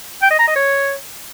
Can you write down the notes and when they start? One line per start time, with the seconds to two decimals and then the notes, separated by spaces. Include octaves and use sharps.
0.22 G5
0.30 D#5
0.39 A#5
0.47 D#5
0.56 C#5